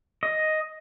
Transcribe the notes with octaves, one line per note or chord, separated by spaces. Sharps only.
D#5